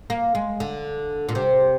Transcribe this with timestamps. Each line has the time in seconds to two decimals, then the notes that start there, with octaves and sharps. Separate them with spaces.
0.10 A#3
0.35 G#3
0.60 D3
1.29 A#2
1.35 C3